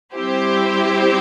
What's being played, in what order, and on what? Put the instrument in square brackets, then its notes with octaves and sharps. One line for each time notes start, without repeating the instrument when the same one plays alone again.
[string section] G3 C4 E4 G4 C5